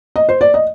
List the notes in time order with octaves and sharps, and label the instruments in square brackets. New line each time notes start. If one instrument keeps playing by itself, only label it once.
[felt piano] D#5
C5
D5
D#5